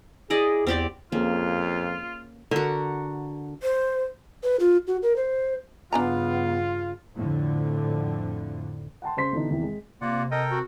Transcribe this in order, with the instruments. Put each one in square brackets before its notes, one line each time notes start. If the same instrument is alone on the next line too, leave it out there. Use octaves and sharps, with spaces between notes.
[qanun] E4 D5 D#5 [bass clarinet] G#4
[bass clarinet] E2 [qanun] C4 G4 D5
[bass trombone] F2 [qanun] A#3 C#4 G#4 [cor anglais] F4
[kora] D3 [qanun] F#4 A#4
[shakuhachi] C5
[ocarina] B4
F4
F#4
A#4
C5
[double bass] G2 C#3 [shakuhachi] B3 [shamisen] D4 G#5 A#5 [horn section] F4
[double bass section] F2 A2 D3
[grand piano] F#5 G5 A5 C6
C#3 C5 C6 B6
B2 D3 E3 D#4
E2 C3 D#3 E3
G#3
[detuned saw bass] C3 [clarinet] A#3 [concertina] F4 D5 F#5
[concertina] A4 A#4 G5 [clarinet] D#5
[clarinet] F#4